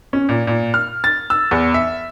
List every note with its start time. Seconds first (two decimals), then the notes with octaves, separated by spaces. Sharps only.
0.13 C#4
0.29 A#2
0.47 A#2
0.74 F6
1.04 A6
1.30 E6
1.51 E2
1.74 E5